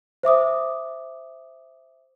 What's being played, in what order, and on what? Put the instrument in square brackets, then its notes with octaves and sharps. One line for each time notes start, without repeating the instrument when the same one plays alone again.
[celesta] C5 E5 D6 D#6